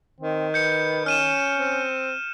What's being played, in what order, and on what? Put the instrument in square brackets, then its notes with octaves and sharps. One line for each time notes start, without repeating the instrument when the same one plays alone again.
[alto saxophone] D#3 [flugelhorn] C4
[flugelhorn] B4 [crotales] G6 C#7
[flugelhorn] C#4 [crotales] F6 D#7 E7
[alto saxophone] C4